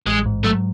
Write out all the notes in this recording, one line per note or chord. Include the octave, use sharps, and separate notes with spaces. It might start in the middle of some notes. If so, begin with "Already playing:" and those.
A1 G#3
G#2
F#3 A3